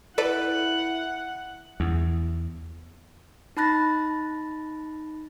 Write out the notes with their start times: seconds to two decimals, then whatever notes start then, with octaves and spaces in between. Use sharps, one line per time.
0.18 E4 A4 B4 D5 F#5
1.80 E2
3.57 D#4 A5 B5 F#6 A6 A#6